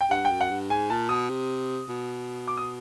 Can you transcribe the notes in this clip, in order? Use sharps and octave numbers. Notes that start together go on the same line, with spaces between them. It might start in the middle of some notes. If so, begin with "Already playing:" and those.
G5
G2 F#5
G5
F#2
F#5
G2
G#2 G#5
A#2 A5
B2 D#6
C3
B2
D6
D#6